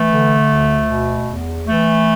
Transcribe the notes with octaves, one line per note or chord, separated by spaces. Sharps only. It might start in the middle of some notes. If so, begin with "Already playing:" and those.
Already playing: E3 A3
D3
D2
B2
E2
E3 A3